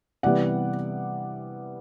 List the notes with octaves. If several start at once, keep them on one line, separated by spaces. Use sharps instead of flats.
C3 E3 G3 B3 D5 F#5